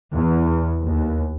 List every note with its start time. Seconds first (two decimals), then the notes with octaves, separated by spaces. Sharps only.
0.13 E2
0.84 D#2